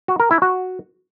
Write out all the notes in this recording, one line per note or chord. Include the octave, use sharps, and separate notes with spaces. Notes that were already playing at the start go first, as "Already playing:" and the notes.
F#4
A#4
E4
F#4